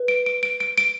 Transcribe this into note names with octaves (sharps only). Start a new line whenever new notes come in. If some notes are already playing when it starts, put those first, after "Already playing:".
Already playing: B4
D7
D7
D7
D7
D7